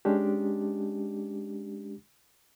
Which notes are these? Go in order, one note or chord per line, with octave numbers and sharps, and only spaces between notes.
G#3 C#4 D4 G4